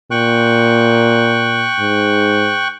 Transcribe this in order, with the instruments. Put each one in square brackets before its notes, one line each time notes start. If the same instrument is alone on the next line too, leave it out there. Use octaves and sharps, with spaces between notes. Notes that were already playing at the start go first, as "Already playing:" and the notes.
[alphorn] A#2 [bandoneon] G5 C#6 F#6
[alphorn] G#2